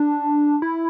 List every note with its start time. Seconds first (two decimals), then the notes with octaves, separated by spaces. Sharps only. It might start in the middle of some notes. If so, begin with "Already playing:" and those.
Already playing: D4
0.62 E4